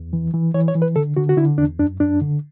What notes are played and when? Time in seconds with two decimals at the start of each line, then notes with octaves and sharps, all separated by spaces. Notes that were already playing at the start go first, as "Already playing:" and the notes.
Already playing: E2
0.13 E3
0.33 E3
0.54 E3 C#5
0.68 C#5
0.75 E3
0.82 B4
0.96 D3 A4
1.17 D3 F#4
1.29 F#4
1.37 D3 E4
1.58 E2 D4
1.79 F#2 D4
2.00 F#2 D4
2.21 D3